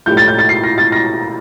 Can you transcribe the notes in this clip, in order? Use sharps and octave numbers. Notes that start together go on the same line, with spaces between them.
A#1 A2 G3 G6
A6
G6
A6
C7
A#6
A6
A#6